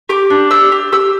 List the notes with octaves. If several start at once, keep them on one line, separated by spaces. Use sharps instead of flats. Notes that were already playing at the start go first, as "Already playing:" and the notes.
G4 D6
D4
G4 E6
G4
G4 E6